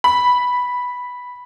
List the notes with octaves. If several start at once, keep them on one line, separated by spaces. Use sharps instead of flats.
B5